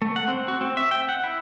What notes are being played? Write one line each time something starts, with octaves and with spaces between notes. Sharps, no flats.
A3
F#5
C4
F#4
C4
E5
G5
F#5
E4